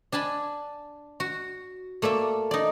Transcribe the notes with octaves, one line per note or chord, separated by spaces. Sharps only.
D4 G#5 A5 B5
F#4
A3 A#3 D5 E5
D#4 D5